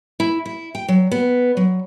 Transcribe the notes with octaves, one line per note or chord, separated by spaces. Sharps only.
E4
E4
G5
F#3
B3
F#3